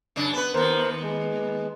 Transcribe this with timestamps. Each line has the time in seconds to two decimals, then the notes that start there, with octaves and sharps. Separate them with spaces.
0.16 F#2 C#3 D4
0.33 B3 B4
0.54 D#2 B3 A#4 C5
1.02 G#3